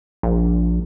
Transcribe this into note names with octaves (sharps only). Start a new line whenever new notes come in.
A#1